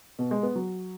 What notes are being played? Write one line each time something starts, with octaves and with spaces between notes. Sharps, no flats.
B2
G#3
B3
F#3